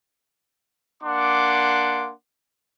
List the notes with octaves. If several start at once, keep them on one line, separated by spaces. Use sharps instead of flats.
A#3 D4 F#5 C6 D6